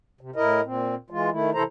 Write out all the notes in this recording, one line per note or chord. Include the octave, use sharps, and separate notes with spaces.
C3
A2 E4 A#4 D#5
A#2 C4
E3 G#3 F4
D#3 A3 E4
C3 E3 E4 A4 C5 A#5